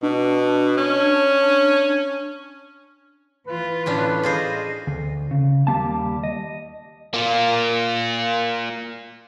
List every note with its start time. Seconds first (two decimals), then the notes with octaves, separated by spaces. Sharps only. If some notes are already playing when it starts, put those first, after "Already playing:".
0.03 B2 D4
0.77 C#4
3.47 E3 F4 B4
3.86 A2 C#4 D4
4.23 D4 F4 G#4 C5 D#5
4.87 D2
5.31 C#3
5.67 D#2 G3 A#3 A5
6.23 D#5
7.14 A#3 F4